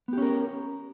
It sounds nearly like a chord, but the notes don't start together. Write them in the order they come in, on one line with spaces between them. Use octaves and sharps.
B3 G4 C#4 A#4